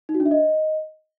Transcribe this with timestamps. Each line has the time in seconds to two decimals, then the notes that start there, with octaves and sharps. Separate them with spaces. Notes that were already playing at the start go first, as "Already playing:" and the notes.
0.09 D#4
0.15 F#4
0.20 D4
0.26 E5
0.31 D#5